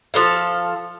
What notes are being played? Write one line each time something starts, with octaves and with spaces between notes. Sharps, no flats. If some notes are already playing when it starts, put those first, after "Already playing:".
F3 A4 F5